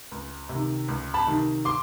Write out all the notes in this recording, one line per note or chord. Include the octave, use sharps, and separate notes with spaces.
C#2
C3
D#3
C#2
A5 B5
C3 D#3
C6 D6